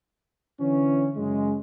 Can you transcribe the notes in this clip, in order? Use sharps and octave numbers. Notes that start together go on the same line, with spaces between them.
D3 E3 C#4
F#2 C#3 G#3